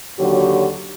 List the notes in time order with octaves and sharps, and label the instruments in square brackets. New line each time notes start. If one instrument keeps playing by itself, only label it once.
[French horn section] D#2 D3 F#3 F#4 G4 C#5